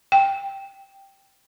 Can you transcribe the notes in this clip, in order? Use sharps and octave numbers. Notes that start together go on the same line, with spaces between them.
G5